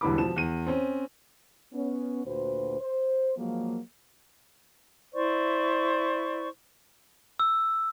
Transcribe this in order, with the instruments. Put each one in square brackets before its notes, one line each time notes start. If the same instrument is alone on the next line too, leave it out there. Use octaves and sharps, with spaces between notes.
[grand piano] E1 C2 D3 E3 B5 D6
B2 F3 E7
E2 D#7
C4 C#4
[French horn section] B3 C#4
D2 A#2 F#4 B4 C5
C5
F3 F#3 G#3 A#3
[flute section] E4 C5 D5 C#6
[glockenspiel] E6